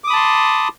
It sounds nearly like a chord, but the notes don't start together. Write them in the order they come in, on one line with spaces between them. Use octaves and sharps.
D6 D#6 B5 A5 C6